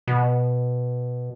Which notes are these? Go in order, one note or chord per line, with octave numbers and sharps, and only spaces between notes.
B2